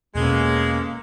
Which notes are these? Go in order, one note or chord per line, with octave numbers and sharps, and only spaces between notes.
E1 B2 G#3 A#3 B3 C#4 A4